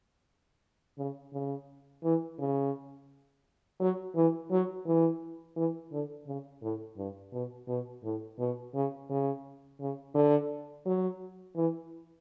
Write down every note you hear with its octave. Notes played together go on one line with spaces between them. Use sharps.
C#3
C#3
E3
C#3
F#3
E3
F#3
E3
E3
D3
C#3
A2
G2
B2
B2
A2
B2
C#3
C#3
C#3
D3
F#3
E3